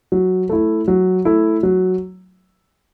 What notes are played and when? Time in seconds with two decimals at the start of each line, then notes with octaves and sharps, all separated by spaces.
0.12 F#3
0.49 A3 E4
0.88 F#3
1.25 A3 E4
1.63 F#3